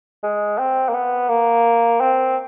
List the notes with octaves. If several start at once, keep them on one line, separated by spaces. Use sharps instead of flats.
G#3
C4
A#3
B3
A#3
C4